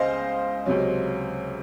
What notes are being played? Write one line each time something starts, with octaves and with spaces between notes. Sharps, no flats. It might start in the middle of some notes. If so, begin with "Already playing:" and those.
Already playing: C#2 C5 D#5 F5 G#5
C#2 C3 F#3 C#4